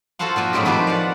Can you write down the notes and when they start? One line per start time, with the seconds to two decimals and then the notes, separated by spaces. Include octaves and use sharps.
0.19 F4 F#4 A4 C5 F5 F#5
0.36 A#2 F3 A#3 G#5
0.53 F2 A2 F#3 G#3 G4
0.65 D#3 F3 G4 B4 C5
0.87 D5 F5 F#5